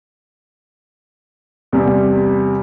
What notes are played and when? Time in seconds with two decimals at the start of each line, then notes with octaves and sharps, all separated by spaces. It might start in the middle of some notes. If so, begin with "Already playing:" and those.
1.72 E2 C3 G3